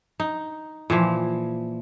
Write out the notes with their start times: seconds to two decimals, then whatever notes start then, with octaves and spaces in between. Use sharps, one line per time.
0.20 D#4
0.90 A#2 E3 F3